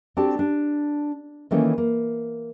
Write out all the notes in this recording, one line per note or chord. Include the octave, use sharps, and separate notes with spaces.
C4 D4 F#4 G4 A4 A5
D4
D#3 E3 A3 A#3 C#4
A#3